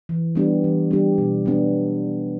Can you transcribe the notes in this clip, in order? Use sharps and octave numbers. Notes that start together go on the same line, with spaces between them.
E3
G3 B3 D4 G4
E3
G3 B3 D4 G4
B2
F#3 B3 D4 G4